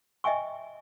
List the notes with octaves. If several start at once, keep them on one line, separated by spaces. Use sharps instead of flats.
D#5 E5 G5 G#5 C#6